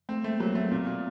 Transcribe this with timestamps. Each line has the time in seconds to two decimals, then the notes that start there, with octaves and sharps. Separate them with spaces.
0.09 A3 C4
0.24 A3 A#3
0.40 F#3 A#3
0.55 A3 B3
0.71 A#2 C4
0.87 A#2